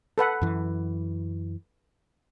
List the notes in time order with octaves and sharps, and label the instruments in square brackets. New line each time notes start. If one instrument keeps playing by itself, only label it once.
[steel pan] A4 B4 F#5
[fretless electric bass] F#2 E3